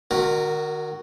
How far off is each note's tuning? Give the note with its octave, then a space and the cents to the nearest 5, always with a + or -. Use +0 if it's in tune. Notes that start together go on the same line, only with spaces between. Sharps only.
D#3 -40 F#4 +0 A#4 +0